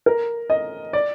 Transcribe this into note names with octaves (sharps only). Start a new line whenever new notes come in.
A#4
D#5
D5